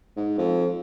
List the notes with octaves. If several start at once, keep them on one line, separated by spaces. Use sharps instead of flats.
G#2
F2